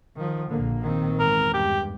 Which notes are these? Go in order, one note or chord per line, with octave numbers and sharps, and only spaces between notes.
D#3 F3
A#1 D3 A#3
D#3 C4
E2 G#2 A#4
G2 G4